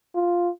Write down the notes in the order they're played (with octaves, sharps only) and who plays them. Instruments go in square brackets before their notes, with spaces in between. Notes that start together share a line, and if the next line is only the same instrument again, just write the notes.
[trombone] F4